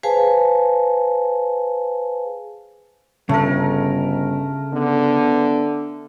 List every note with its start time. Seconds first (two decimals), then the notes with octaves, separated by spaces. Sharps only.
0.03 G#4 B4 C5 F5 G#5 A5
3.29 G1 C#3 A3 A#4
4.73 D3 B3